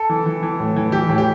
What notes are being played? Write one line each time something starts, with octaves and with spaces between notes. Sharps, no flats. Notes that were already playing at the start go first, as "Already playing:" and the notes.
Already playing: A4
E3
E3
E3
A2
E3
E3 G4
A2
G4